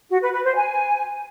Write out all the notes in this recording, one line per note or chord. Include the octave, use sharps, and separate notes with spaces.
F#4
B4
B4
C5
G#5